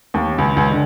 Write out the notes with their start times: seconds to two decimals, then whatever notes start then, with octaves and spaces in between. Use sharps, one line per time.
0.14 D#2
0.38 C#2
0.57 C#2
0.71 D3